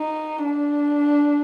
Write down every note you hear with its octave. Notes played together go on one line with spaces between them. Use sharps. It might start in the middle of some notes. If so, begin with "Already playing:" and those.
Already playing: D#4
D4